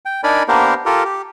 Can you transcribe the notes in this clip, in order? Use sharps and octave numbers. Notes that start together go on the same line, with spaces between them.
G5
D4 D#4 A#4 D5 G#5 B5
A#3 B3 D4 G4 A#4 C5
F4 G4 A4 A#4
G4